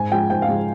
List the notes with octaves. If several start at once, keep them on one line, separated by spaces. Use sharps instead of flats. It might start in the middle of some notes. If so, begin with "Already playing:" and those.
Already playing: G#2 G#5
F3 G#3 G5
G#2 G5
F5
F3 G#3